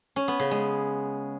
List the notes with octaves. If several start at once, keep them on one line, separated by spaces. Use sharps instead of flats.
C#4
B3
C#3
G#3